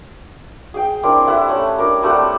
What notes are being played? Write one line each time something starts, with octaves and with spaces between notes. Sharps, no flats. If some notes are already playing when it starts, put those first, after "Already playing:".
G#4 G5
C4 D4 E4 A#4
E4 G4 A4 F#5
A3 C#4
D4 A#4 A#5
G3 A3 C4 F#5